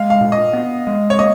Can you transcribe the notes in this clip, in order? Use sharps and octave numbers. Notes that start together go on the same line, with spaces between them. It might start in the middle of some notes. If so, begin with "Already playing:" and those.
Already playing: G#3 F5
F5
A#2
D#5
B3
G#3
C#5
A#3 D#5